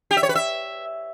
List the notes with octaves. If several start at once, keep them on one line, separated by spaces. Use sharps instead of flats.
G4
E5
C#5
B4
E5